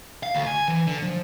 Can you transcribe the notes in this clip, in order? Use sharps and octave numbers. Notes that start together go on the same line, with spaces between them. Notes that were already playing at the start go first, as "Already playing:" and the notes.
F5
D2
G#5
E3
D3
F3